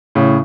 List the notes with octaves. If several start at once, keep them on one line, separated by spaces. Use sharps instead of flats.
A2 C#3